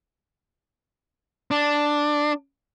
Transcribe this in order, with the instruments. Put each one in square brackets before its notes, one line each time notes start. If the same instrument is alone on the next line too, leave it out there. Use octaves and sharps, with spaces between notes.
[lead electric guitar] D4